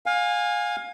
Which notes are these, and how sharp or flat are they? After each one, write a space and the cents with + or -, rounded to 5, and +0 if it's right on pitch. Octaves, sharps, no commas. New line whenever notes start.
F5 +25 G#5 -15